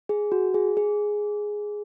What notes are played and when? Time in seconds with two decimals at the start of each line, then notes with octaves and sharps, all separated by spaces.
0.09 G#4
0.32 F#4
0.54 G#4
0.77 G#4